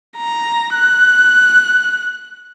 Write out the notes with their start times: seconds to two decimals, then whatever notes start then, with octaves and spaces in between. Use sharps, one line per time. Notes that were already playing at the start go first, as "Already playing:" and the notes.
0.17 A#5
0.74 F#6